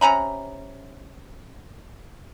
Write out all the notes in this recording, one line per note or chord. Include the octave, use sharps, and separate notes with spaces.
C3 C#4 A#5 B5